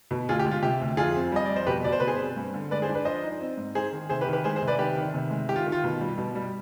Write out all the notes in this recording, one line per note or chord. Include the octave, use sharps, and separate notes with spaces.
B2
D2 F4 G#4
G4
G#3
F4
C3 G4
D2
F2 F4 G#4
C4
G3 D#5
F2 D5
C5
B2 G4 B4
B2 D5
C5
B2 B4
G#4 C5
C4
G2
D3
G#3 B4 D5
G#4 C5
D4
B4 D5
F3 C5 D#5
D#4
C4
G#2
D#4 G#4 C5
D#3
C3 G#4 C5
G4 B4
D#3
G4 B4
G#3 G#4 C5
G#4 C5
C3
B4 D5
D#3 G4 B4
D#3
C3
G#3
D#3 G4
F4
D#3
F4
B2
G3
B2
G3